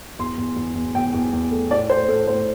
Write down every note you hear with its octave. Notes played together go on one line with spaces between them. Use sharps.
E2 C6
E2
E2
E2
E2 G5
E2
E2
A3
A2 D5
A3 C5
A2 A4
A2 C5